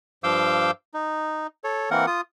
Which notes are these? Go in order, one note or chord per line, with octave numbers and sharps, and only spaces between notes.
G2 F3 F5 D6 E6 G6
D#4
A4 C#5
E3 A#3 C4 A#4 F#5
F4 D#6